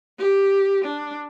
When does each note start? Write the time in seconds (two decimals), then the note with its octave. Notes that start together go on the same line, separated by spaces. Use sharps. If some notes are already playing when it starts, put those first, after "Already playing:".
0.19 G4
0.85 D4